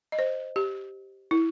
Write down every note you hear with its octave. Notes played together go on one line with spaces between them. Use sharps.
D#5
C5
G4
E4